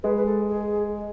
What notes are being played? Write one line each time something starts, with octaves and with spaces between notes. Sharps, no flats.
G#3 B4
B4
A4
G#4